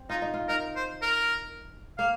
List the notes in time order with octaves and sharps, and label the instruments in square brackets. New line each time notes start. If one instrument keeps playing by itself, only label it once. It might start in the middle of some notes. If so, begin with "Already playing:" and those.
Already playing: [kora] C4
[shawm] D#4 [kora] F4
[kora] D#4
F4
[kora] D#4 [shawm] A#4
[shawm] C5
A#4
[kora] A#3 [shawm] F5